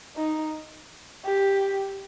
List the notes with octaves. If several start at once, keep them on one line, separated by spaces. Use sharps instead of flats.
D#4
G4